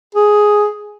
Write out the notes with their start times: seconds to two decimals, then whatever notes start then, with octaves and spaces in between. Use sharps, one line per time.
0.15 G#4